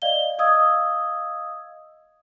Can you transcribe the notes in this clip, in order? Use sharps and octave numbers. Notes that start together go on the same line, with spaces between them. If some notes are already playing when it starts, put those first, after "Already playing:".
D5 D#5 F5 G7
D#5 F5 D#6 E6 G#6